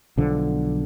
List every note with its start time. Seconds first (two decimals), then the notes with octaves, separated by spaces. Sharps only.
0.18 B1 D3 F3